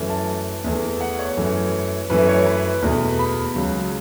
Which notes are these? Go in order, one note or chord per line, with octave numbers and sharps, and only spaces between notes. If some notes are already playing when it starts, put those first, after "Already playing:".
Already playing: F#2 E3 A3
A5
E2 E3 A3
F#5
C#5
F#2 E3 A3
F#2 E3 A3 B4
C#5
B4
E2 B2 A3
B5
C#2 C#3 F#3